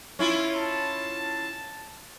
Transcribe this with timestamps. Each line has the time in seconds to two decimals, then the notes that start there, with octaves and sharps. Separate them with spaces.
0.19 C#4 E4 F4
0.55 A5